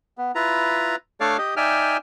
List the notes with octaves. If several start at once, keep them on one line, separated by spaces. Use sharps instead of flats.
B3
E4 F4 B4 A#5
A3 D4 A4 C#5 D5 F5
G4 D#5
D#4 D5 E5 G5 G#5 F6